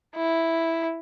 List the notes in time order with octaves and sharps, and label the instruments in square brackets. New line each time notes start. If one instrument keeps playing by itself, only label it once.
[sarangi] E4